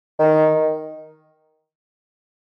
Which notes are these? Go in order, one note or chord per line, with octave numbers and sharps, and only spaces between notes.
D#3